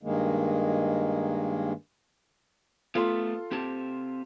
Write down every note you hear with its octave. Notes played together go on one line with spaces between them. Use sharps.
G2 D#3 G#3 A#3
A3 B3 F4 A4 C6
C4 G4 A5